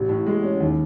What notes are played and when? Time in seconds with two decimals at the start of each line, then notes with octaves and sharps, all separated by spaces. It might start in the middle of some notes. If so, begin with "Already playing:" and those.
Already playing: A1
0.09 A2
0.27 G#3
0.43 C#4
0.60 D#2